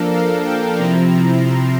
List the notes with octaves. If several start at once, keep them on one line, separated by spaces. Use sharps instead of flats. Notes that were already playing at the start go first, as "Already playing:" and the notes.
Already playing: F3 A#3 D4 A4 A#4
F5
G5
C3 F3 C4 E4 A#5
A#5
C6